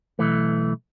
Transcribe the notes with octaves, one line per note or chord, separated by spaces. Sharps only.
B1 E3 A3